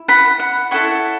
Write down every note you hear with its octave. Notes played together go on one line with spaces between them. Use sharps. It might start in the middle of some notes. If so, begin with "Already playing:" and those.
Already playing: E4
F#5 B5
F#5
E4 A4 C#5 F#5